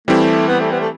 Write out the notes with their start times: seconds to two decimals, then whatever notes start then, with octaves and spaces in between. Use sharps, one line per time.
0.08 E3 G3 A3 C4 E4 G4
0.48 B3
0.60 A3
0.72 B3
0.80 A3